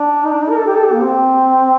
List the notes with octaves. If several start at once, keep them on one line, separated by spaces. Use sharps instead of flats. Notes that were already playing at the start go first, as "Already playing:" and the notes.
Already playing: D4
D#4
D4
D#4
A#4
A4
G4
A4
G4
A#3
C4